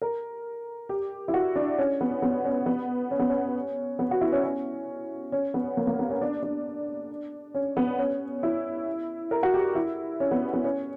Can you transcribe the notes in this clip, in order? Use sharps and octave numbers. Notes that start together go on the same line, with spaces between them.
A#4
G4
E4
F#4
D4
C#4
B3
B3
C#4
B3
C#4
B3
C#4
B3
F#4
E4
C#4
C#4
C#4
B3
A#3
A#3
B3
C#4
D4
D4
C#4
B3
C#4
E4
A#4
F#4
G4
E4
C#4
B3
B3
C#4